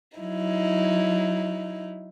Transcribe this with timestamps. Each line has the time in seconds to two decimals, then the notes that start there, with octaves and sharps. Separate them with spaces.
0.19 F#3 D#4 E4